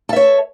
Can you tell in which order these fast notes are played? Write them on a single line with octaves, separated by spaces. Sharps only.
A4 E5 C#5